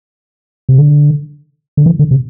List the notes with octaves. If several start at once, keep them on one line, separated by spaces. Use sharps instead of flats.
C3
D3
D3
E3
D3
C3